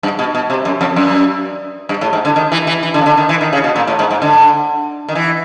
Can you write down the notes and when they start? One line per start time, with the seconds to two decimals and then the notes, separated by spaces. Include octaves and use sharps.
0.03 G2
0.19 B2
0.35 B2
0.50 C3
0.65 F#2
0.81 F2
0.96 F#2
1.89 G2
2.01 A2
2.13 G#2
2.25 D3
2.36 D#3
2.52 E3
2.67 E3
2.83 E3
2.94 D3
3.01 C#3
3.06 D3
3.17 D#3
3.29 E3
3.41 D#3
3.53 C#3
3.64 B2
3.76 A#2
3.87 A2
3.99 G#2
4.11 G#2
4.22 D3
5.09 D#3
5.15 E3